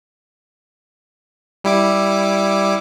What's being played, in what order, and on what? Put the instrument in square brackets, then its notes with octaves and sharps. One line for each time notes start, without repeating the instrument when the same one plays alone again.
[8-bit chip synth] G3 E4 D6